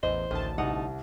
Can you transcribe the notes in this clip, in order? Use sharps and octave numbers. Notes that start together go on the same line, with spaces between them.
A1 E2 C5 D#5
A1 D2 D#3 A5
C2 D#4 F#5